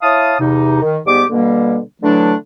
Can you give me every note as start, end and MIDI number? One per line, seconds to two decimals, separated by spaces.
0.02 0.36 64
0.02 0.36 73
0.02 0.36 77
0.02 0.36 81
0.02 0.36 87
0.40 0.82 40
0.40 0.82 48
0.40 0.82 63
0.82 0.98 51
1.06 1.24 44
1.06 1.24 55
1.06 1.24 59
1.06 1.24 67
1.06 1.24 86
1.30 1.79 47
1.30 1.79 50
1.30 1.79 55
1.30 1.79 58
2.02 2.35 50
2.02 2.35 52
2.02 2.35 54
2.02 2.35 57
2.02 2.35 62